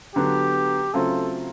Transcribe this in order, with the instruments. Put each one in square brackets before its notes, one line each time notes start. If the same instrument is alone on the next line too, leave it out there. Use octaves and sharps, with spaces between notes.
[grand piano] D3 F#3 B3 [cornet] G4
[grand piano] C#3 F#3 A3 C4 F4 [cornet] A4